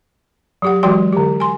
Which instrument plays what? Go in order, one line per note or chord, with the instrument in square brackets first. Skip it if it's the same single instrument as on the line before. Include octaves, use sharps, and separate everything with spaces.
[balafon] F#3 G4 F#5
E3 F#3 G#3 F#4 G5 C6
D3 G4
G#5 C6